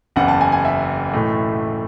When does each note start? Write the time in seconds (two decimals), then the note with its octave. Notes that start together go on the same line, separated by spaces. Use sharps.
0.16 F#1 E2 C#3 F#5
0.28 A5
0.41 G#5
0.52 G#5
0.65 E5
1.13 B1 A2 E3 A3